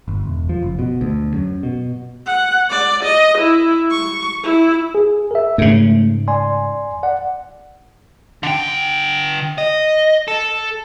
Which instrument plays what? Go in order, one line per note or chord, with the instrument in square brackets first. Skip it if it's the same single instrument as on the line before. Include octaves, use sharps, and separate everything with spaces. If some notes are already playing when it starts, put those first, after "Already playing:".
[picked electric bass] G1
E1
F3
F#1
B2
D2
F#2
B2
[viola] F#5
D5
D#5
E4
C#6
E4
[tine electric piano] G#4
A#4 E5
[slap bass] G#2 C#3 [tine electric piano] A3
[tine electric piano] D5 G#5 C6
D5 F#5
[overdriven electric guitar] D3 G5
D#5
A4